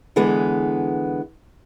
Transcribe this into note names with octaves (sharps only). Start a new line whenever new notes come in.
D3 E3 G#3 B3